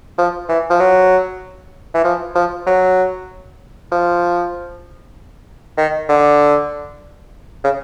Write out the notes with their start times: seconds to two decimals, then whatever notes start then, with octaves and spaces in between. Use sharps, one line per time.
0.18 F3
0.49 E3
0.70 F3
0.80 F#3
1.94 E3
2.04 F3
2.35 F3
2.66 F#3
3.92 F3
5.77 D#3
6.09 D3
7.64 C#3